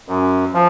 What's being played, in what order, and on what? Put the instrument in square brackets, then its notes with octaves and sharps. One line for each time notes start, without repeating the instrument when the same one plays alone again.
[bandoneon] F#2
F3